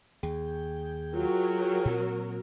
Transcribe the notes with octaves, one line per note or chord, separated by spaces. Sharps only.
D#2 G#4 G5
F#3 F4 A#4
A#2 C4